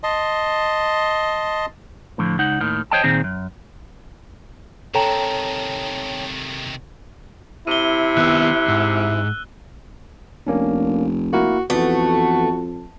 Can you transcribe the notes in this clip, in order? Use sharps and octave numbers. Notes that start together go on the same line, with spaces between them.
D#5 A5 C6
A2 D3 F3
C#2 D#4 F#5
D#2 A2 D#3
C5 C#5 D#5 G5 A5
A#2 D#3 C4 G#4
F#2
C3 D#3 A4 C#5 G5 A5 A#5
C3 E4 D#7 G7
D#3 B3 E6 F#6
G#2
F1 A#3 C#4 D4
A#3 E4 F#4 A#4
F2 E3 A3 B3 F#4